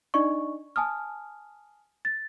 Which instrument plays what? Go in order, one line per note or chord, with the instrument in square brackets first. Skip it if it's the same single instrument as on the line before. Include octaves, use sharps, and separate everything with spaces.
[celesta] D4 D#4 D5 D#5 C#6
G#5 A5 D#6 F6
A6